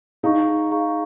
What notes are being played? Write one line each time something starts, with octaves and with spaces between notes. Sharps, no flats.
D#4 G#4 F5 A#5 C#6
G#4 F5 A#5 C#6